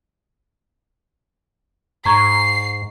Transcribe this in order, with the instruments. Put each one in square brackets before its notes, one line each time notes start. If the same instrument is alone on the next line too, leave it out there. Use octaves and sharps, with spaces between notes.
[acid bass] G#2 [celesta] A#5 C#6 G#6 [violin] C7